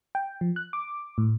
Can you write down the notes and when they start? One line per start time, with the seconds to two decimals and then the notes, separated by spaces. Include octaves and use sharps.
0.15 G5
0.41 F3
0.56 F#6
0.73 D6
1.18 A2